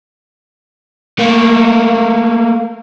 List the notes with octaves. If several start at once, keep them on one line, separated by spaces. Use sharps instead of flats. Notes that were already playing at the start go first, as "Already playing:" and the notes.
A3 A#3